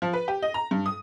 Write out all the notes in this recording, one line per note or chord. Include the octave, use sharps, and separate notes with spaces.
F3
B4
G4
D#5
A#5
G2
D#6